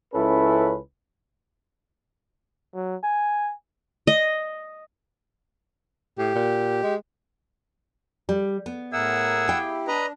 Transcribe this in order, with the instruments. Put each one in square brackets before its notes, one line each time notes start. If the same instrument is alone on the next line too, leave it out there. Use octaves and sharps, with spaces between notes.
[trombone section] C#2 C#4 E4 A4 B4
[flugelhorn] F#3
G#5
[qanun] D#5
[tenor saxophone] A2 [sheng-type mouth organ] G4
[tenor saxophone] A#2
G#3
[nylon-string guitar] G3
B3
[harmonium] A2 A#4 E5 [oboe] G#4 [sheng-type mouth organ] F#5 E6
[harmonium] E4 G4 [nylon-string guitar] F5 G5
[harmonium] D4 [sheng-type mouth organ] B4 D#5 A#5